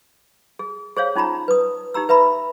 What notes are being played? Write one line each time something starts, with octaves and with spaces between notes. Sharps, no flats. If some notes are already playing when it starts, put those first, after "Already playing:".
G#4
G#4 C5 C#5 F5
C#4 D#4 F4 A5 A#5
B4 D#6
D#4 G4 A#5 E6
B4 E5 A#5 B5